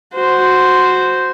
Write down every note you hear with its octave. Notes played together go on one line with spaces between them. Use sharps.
F#4 C5